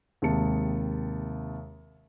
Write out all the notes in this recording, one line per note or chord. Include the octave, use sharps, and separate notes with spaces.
D#2 C3 G#3 A5 C#7